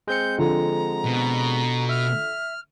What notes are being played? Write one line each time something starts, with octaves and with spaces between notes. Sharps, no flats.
G#3 C4 G6 C#7
D3 F3 A#5
B2
E5 F6